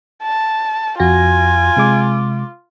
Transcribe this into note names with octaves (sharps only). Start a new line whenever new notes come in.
A5
F2 F4 F#4 G#5 A#6
C3 G#3 D6